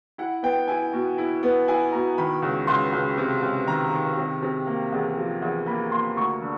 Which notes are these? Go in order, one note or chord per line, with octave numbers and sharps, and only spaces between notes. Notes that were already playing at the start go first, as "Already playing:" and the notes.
E4 F#5
B3 G5
E4 G#5
B2
E4
B3
E4 G#5
B2 A#5
D#3 B5
C#2
C#2 C6
C#2
C3
C#2
D#3 A#5
D#3
C3
C3
A#3
E2
F3
E2
A#3 B5
A#3 C6
D2 C#6
D3